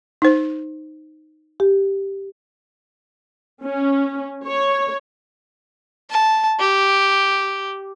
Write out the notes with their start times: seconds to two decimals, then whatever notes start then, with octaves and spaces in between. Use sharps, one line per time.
0.22 D#4 C5
1.60 G4
3.64 C#4
4.45 C#5
6.11 A5
6.60 G4